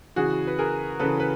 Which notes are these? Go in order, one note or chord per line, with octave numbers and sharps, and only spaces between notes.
C#3 E3 F#4 G#4
B4
G#4 A#4
C#3 E3 A4 B4
B4